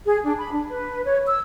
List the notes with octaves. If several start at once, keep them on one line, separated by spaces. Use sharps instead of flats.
G#4
D4
B5
D4
B4
C#5
E6